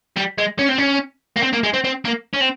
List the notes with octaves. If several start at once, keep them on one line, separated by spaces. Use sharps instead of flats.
G3
G#3
C#4
C4
C#4
A#3
C4
A#3
G#3
C4
C4
A#3
C#4
C4